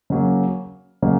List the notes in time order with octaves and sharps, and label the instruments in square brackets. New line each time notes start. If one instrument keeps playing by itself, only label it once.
[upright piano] C#3 F#3 A#3
C#3 F#3 A#3